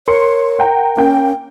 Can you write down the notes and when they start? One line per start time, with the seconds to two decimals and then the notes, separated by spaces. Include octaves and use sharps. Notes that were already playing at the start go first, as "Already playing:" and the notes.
0.08 A#4 C#5 C6 C#7
0.59 F#5 G5 A#5
0.97 A#3 C#4 G5